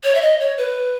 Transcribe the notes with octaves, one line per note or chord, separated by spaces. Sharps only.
C#5
E5
D#5
C#5
B4